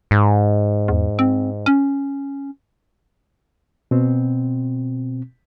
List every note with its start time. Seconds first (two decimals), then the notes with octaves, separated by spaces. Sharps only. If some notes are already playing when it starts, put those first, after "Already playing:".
0.11 G#2
0.88 E2
1.19 C4
1.66 C#4
3.91 B2 C4